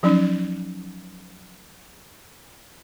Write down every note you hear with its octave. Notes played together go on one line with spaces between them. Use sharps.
F3 F#3 C#4 D#4